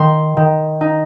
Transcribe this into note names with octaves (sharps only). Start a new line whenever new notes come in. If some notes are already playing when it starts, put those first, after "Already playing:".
Already playing: D#3 C6
D#3
D#4